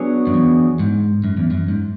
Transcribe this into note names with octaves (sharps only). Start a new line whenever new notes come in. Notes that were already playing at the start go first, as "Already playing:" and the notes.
Already playing: F#3 B3 D4 G#4 C#5
F#2
E2
G#2
F#2
E2
F#2
G#2